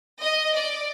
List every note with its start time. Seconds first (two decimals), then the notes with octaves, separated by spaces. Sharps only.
0.20 D#5
0.53 D5